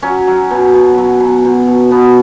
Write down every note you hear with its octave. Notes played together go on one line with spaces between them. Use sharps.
F#3 C#4
F#3
B2
B2
F#3
B2
B2
B2
B2 B3